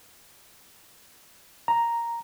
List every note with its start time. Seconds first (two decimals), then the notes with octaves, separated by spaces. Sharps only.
1.68 A#5